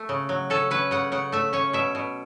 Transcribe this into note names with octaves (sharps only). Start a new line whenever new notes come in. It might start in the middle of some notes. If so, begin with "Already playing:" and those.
Already playing: A3
C#3
F#3
C#4 A4
C#4 B4
C#3 F#5
C#3 F#5
A3 E5
C#4 C#5
B2 E5
B2